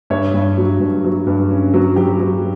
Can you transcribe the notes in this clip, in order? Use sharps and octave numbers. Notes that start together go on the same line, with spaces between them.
G2 C#5 E5
G2
F#3
G2
F#3
G2
C#4
F#3
F#3 G4
F#3